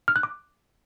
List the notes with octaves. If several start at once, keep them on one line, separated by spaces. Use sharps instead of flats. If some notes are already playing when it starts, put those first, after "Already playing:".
F6
F#6
D6